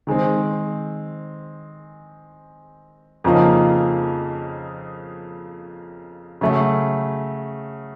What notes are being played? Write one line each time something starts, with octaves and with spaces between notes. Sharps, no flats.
D#3 G#3 C4
F2 C#3 F3 A#3 D#4
C#3 F#3 A3